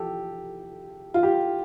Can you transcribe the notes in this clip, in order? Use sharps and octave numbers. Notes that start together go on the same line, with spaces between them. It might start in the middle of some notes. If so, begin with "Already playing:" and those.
Already playing: F3 G4 A4
F4
G4